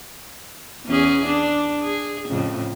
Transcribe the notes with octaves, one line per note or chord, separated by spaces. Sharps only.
E2 C#4 G#4
D4
G#4
F2 A2 C#3